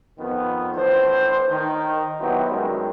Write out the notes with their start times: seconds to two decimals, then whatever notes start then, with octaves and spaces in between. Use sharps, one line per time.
0.19 F2 D#3 B3
0.75 A2 E3 D4 C5
1.50 D#3
2.21 F#3 B3 C4 D#4 E4 G4
2.50 F#2 D#3 G3 G#3